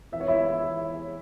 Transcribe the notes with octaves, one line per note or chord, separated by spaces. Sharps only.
E3 E5
C#5
E4 E5